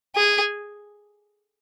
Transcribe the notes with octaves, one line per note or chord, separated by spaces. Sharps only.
G#4